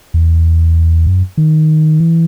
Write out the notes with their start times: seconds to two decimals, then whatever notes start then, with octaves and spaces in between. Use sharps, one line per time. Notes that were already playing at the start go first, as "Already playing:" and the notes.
0.14 E2
1.06 F#2
1.37 D#3
2.00 E3